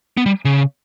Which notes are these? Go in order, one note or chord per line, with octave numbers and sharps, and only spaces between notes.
B3
G3
C#3